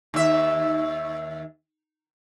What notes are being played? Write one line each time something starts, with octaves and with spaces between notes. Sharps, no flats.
D#2 E5